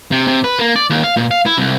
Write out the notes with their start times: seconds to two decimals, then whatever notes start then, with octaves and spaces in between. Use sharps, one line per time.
0.11 C3
0.28 C3
0.44 B4
0.59 A#3
0.76 D5
0.90 D#2
1.04 F5
1.17 A#2
1.31 F5
1.46 E4
1.58 C2